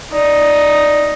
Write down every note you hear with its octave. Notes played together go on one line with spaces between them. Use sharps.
D#4 D5